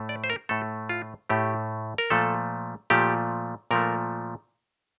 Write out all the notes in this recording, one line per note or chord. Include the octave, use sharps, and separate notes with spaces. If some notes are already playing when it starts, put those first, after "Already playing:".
Already playing: A2 A3
D5
C5
A#4
A2 A3 A4
F4
A2 A3 G4
A#4
A#2 F3 A3 A4
A#2 F3 A3 G4
A#2 F3 A3 A#4